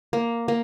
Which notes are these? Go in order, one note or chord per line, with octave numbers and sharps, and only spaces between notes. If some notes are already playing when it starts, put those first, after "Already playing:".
A#3
A#3